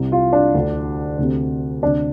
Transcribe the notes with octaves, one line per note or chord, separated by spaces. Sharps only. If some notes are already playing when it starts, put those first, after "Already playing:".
Already playing: C2 C3
F4
D4
D2 D3
D2 C3
D2 C3 D4